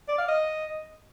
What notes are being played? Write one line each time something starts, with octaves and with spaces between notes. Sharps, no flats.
D5
F5
D#5